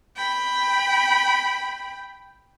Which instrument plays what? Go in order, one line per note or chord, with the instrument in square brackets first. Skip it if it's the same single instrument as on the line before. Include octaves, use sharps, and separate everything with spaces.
[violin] G5 B5